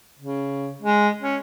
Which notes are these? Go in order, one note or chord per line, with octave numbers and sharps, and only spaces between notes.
C#3
G#3
C#4